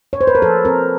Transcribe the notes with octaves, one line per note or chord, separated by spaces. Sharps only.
C#5
C5
B4
A#4
F3 A4
C4 A#4